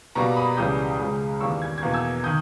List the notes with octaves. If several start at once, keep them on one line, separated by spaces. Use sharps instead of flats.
B2 G3 A#3 A#5 C#6
B5 D#6
C#2 C#3 E3 G3 D#6 G6
C#2 C#3 G#3
E2 D#3 G3 A#3 C#6 E6
G#6
G#6
E2 B2 A#3
E6 G#6
D#3 D#6 G6